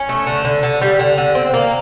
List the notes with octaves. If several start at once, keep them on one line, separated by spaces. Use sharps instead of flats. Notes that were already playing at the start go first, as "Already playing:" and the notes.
Already playing: C#4
A3
D3
D3
D3
G3
D3
D3
C4
A#3